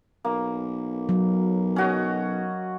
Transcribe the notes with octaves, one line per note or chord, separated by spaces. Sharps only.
B1 A#3
F#3
C#4 F#4 D#5